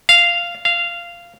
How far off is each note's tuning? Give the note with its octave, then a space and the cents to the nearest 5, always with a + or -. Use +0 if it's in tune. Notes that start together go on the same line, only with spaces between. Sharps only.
F5 -10
F5 -15